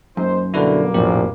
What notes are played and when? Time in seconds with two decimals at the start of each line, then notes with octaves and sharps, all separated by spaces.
0.17 F#2 A#3 D#4 C5
0.54 B2 D3 G3 A#3 E4 F#4 B4
0.94 A#1 F2 A2 G4